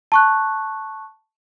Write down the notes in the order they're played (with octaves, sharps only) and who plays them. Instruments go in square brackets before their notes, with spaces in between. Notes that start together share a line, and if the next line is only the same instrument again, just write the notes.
[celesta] A5 C#6 F#6